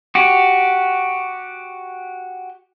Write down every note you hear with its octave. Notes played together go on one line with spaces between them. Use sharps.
F#4 G4